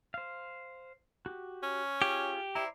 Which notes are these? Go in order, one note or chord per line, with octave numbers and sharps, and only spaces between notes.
C5 F5
F#4 G4
C#4
F4 G4 G#4
E4 C5 D5 A#5